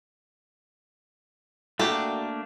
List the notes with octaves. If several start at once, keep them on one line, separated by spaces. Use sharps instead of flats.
A3 A#3 D4 F#4 G4 A4